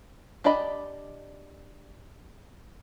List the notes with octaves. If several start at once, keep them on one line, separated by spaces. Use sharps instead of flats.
D4 G4 D5 D#5 B5